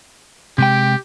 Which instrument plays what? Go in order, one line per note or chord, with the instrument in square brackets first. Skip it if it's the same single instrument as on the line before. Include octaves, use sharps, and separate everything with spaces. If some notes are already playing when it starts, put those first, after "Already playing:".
[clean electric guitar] C3 G#3 G5 [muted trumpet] G4